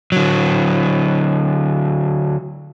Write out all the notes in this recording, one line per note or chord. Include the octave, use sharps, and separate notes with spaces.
D3 F#3